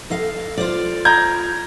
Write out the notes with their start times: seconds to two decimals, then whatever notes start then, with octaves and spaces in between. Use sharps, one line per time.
0.10 A4 D#5 F5
0.58 F4 C5 D5
1.05 A#5 G6 G#6